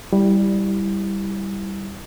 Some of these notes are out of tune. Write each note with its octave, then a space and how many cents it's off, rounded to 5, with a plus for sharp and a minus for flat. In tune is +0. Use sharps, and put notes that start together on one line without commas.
G3 +0 E4 +0